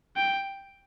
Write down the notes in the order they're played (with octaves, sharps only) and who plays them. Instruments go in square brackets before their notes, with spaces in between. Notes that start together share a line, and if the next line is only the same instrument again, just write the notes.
[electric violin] G5